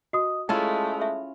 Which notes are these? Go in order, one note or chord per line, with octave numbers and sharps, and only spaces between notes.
F#4 D#5 D#6
G#3 A3 C#4 E4 F4 A5
E5